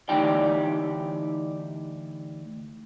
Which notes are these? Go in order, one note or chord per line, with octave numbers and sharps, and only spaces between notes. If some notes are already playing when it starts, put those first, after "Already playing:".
D2 E3 D#4 G4 D5 G5